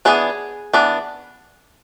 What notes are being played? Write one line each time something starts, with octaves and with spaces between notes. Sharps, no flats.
E3 B3 D4 G#4
E3 B3 D4